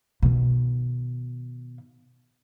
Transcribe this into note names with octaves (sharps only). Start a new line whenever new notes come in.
B2 D#3